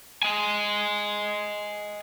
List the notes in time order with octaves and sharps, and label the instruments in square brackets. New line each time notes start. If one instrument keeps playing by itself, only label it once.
[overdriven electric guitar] D#5 G#5